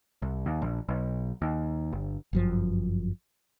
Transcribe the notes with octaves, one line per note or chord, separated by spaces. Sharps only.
C2
D#2
A#1
B1
D#2
G1
G1 F#2 F3